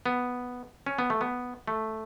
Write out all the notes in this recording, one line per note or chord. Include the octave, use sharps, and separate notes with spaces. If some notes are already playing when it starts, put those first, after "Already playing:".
B3
C#4
B3
A3
B3
A3